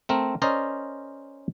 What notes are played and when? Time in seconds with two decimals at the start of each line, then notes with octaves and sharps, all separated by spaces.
0.09 A3 C4 A#4
0.42 C#4 A#4 C5 D5 D#5